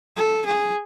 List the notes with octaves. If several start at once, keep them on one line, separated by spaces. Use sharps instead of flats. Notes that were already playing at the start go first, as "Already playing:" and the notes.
A4
G#4